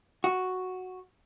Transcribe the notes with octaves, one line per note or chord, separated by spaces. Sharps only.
F#4